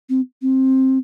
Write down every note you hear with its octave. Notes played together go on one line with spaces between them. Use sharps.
C4
C4